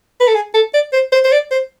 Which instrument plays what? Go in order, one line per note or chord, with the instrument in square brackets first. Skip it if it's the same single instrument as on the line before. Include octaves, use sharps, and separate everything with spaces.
[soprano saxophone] B4
A4
G#4
A4
D5
C5
C5
C5
D5
C5